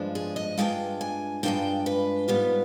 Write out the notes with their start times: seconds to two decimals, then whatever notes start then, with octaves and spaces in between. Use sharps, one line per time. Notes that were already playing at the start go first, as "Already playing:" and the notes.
Already playing: G2 F3 G#3 D4 F4
0.15 G#4
0.36 D#5
0.58 G2 F3 G#3 D4 F4 G5
1.01 G#5
1.43 G2 F3 G#3 D4 F4 G5
1.86 B4
2.28 G#2 G3 B3 F4